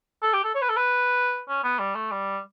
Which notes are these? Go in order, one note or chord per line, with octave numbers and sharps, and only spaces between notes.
A4
G4
A4
C#5
B4
A4
B4
C#4
B3
G3
A3
G3